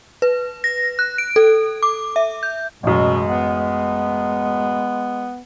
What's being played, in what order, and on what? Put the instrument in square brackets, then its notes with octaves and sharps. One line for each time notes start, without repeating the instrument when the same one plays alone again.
[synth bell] B4
A#6
F#6
D7
A4
D6
E5
G6
[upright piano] A1 F#2 [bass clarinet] B2 [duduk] G#3
[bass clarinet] B3